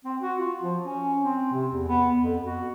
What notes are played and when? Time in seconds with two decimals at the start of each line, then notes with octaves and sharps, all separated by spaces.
0.05 C4
0.21 F#4
0.39 F4
0.62 F3
0.85 C#4
1.22 C4
1.52 C3
1.72 E2
1.88 B3
2.21 F2
2.45 F#4